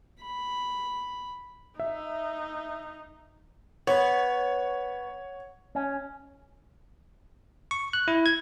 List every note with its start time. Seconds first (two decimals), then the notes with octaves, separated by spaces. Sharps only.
0.21 B5
1.80 D#4 E5
3.87 B3 C#5
5.75 C#4
7.71 C#6
7.93 F#6
8.08 E4
8.26 G#6